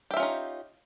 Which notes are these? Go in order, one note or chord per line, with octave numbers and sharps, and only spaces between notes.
C#4 D#4 F4 G4 E5